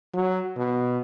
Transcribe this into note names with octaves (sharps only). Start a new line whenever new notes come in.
F#3
B2